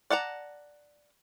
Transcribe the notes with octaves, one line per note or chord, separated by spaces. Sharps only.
D5 F#5 A5 A#5